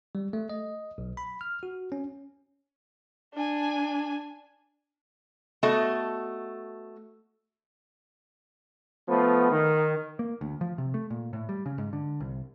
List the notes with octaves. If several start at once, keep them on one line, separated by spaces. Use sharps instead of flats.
G3
A3
D#5
B1
B5
F6
F#4
C#4
D4 G#5
A3 B3 F#4 D#5 A5
F3 A3 B3
D#3
A#3
D2
F3
C3
A3
A#2
A2
G3
C#3
G#2
D3
C2